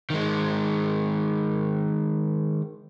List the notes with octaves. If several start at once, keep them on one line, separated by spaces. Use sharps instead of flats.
D#3 G#3